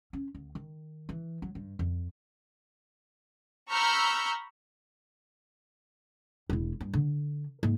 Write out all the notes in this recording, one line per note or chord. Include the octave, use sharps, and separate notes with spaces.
C#4
D2
D#3
E3
F#3
G2
F2
A#5 B5 C#6 E6 F6 G6
E1 E4
G2
D3
G#2 A#3